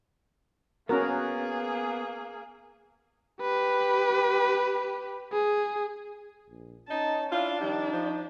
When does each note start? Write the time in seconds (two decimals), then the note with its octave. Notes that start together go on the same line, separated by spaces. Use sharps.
0.89 A#3 B3 C#4 F#4 G#4 A#4
3.42 G4 B4
5.32 G#4
6.50 A#1
6.89 C#4 D#4 A5
7.30 D4 E4 F4
7.60 D#3 F3 G3 D#4
7.92 F3